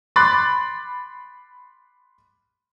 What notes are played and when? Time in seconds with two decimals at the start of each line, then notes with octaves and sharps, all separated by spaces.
0.16 B5 C6 D6 F#6 A6